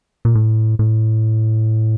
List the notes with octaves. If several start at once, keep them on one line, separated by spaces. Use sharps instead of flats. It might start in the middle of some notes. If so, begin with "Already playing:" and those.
A#2
A2
A2